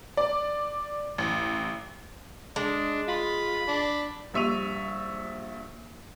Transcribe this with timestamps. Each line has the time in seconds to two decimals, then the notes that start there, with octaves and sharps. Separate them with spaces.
0.17 D5
1.18 A1
2.56 G#3 D4
3.08 F4 B5
3.68 D4
4.34 A#1 G3 E5 C#6 D#7 F7